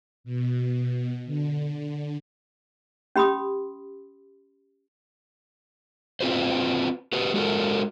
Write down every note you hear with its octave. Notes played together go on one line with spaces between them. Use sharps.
B2
D3
C#4 G4 B5 C6 D#6
C4 F4 F#4 B4 C5
F#4 G4 B4
G#3 F#4 A4 A#4